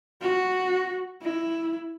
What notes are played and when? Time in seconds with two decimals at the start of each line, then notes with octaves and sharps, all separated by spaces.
0.22 F#4
1.22 E4